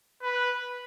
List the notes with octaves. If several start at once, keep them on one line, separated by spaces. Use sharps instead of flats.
B4